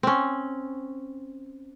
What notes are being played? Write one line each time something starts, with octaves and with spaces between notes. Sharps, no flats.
C4 C#4